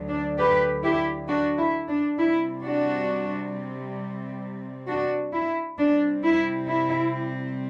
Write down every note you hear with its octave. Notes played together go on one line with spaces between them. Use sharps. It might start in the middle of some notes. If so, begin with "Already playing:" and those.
Already playing: D2 D3 F#3
D4
G4 B4
E4 G4
D4 F#4
E4
D4
C3 G3 C4 E4
D4 F#4
D4 F#4
E4
C3 G3 C4 D4
E4
E4